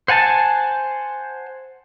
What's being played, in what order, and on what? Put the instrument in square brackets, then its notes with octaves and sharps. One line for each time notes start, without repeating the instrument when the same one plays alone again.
[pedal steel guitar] C5 F#5 G#5 A5